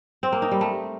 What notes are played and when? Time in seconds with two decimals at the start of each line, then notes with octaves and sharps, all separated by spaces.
0.23 C4
0.32 A#3
0.42 D#4
0.51 G3
0.61 A3